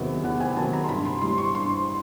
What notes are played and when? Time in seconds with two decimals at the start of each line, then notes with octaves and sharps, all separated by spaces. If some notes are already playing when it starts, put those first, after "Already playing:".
Already playing: E2 C3 D#3 F#3 B3 E5
0.24 E2 F#5
0.41 G#5
0.56 C3 D#3 F#3 B3 A5
0.73 A#5
0.84 C6
0.89 G2 B5
1.05 C6
1.21 E3 G3 C6
1.38 C#6
1.55 G2 C6